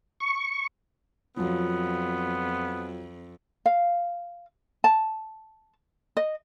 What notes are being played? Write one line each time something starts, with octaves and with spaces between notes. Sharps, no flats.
C#6
F2 F3 F#3 B3
F5
A5
D#5